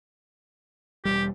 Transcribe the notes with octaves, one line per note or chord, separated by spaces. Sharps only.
E1 D#2 G3 G4